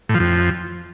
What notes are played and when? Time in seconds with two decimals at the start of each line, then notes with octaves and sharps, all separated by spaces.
0.09 A2
0.15 F3
0.20 F2